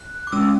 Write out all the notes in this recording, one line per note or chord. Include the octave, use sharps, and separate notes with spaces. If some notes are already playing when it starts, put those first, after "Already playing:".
Already playing: F#6
D6
G#3 C#4 E6